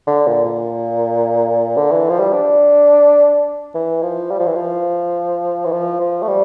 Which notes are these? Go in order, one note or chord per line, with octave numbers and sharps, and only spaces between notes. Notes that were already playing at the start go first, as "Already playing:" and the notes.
D3
A#2
A#2
D3
E3
F3
G3
D4
E3
F3
G3
F3
E3
F3
E3
F3
F3
A3
G3